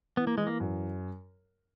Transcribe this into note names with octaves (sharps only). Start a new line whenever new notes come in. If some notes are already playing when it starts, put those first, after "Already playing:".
E3 B3
A#3
E3 G#3
A#3
F#2